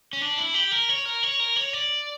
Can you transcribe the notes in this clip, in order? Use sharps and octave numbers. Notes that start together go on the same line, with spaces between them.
C#4
D4
E4
G4
A#4
C#5
A#4
C#5
A#4
C#5
D5